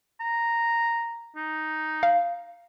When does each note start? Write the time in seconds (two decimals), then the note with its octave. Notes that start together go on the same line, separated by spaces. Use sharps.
0.20 A#5
1.36 D#4
2.03 F5